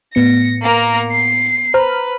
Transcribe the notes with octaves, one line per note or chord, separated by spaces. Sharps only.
A2 B3 A#6 C#7
A#3 A#4
C7
B4 C5 A#5 F6